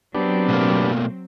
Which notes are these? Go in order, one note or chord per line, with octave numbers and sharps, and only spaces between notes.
F#3 B3 C4 D4 G4
B2 A3 A#3